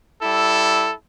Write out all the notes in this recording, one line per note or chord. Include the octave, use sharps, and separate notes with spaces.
G3 E4 A4